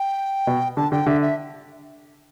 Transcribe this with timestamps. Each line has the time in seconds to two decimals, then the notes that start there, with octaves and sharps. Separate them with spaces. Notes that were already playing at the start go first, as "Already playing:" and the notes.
Already playing: G5
0.47 B2
0.77 D3 A5
0.92 D3 G5
1.06 D3 E5
1.22 E5